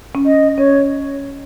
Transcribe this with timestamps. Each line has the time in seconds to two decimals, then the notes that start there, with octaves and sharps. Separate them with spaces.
0.15 C#4
0.25 D#5
0.58 C#4 C#5